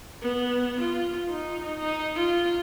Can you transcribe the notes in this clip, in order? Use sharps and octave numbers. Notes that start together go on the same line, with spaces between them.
B3
F4
D#4
D#4
F4